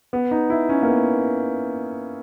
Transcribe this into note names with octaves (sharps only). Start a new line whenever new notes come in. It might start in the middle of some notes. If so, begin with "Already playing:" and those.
B3
D#4
E4
C#4
A#3
B3